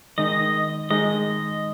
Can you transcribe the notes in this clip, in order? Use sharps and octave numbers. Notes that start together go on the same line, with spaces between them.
D#3 G#3 D#4 D#5
D#3 G#3 D#4 D#5